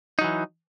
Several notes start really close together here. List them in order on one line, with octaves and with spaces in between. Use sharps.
D#4 F#3 E3